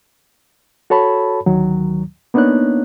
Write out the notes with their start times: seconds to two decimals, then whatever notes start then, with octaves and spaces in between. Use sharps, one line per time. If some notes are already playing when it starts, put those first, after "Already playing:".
0.90 F#4 A4 C#5 A5 B5
1.46 D2 D#3 F#3
2.34 A#3 B3 D4 D#4 C#5 F#6